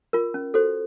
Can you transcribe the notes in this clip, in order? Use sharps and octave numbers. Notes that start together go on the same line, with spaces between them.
F4 A#4
C#4
F#4 A4 C5